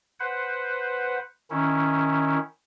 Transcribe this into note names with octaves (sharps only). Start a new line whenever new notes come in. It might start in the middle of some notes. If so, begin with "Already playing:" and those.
B4 C5 F#5
D#3 C#4 E4